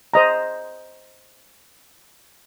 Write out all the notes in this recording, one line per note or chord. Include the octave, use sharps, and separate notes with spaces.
C5 D#5 A#5